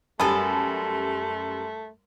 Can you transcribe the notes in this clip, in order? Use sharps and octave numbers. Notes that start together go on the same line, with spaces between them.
F#2 G3 A3 B3 A4 A#4 C#5 G#5